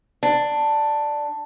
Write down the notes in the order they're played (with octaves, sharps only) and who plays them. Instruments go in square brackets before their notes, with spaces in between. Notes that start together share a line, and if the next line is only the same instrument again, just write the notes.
[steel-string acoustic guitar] D4